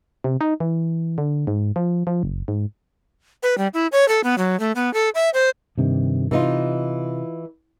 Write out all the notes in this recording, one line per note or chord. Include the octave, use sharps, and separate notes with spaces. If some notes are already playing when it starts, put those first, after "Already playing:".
C3
D#4
E3
D3
G#2
F3
F3
F#1
G#2
B4
G3
E4
C#5
A4
B3
F#3
A3
B3
A4
E5
C5
G2 C3 D#3
C3 E3 D#4 F4